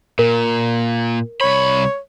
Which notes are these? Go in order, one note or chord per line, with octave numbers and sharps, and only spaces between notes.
A#2 A#4
C2 C#5 B5